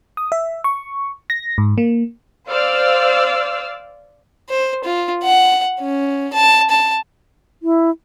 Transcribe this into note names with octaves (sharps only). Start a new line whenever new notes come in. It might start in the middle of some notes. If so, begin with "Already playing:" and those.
D#6
E5
C#6
A#6
G#2
A#3
C5 D5 F5 E6 F6
C5
F4
F#5
C#4
A5
A5
E4